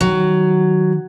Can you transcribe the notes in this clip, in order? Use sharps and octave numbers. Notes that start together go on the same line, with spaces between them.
D#3 F#3